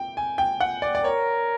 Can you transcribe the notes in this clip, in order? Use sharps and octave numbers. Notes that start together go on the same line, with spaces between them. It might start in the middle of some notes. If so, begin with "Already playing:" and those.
Already playing: G5
G#5
G5
F#5
D5
D5
A#4 C#5